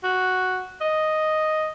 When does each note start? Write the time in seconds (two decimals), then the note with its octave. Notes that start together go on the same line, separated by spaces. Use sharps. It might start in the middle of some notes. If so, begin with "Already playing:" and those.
0.04 F#4
0.81 D#5